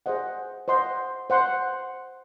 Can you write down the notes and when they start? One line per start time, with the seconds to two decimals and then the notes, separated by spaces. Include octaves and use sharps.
0.06 G#4 C5 D#5 F#5
0.68 C5 D#5 F#5 C6
1.30 C5 F#5 C6